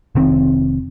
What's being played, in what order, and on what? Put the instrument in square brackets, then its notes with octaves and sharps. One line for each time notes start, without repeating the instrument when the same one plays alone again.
[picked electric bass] F1 D#3 C4